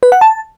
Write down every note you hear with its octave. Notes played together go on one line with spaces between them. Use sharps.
B4
F#5
A5